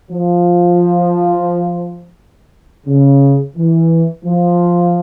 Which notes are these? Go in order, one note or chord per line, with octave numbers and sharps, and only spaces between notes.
F3
C#3
E3
F3